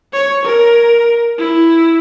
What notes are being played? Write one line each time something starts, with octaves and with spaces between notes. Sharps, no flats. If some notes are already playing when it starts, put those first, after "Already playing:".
C#5
A#4
E4